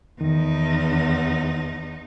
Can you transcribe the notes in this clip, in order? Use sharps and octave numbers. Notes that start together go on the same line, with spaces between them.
E2 D#3 D#4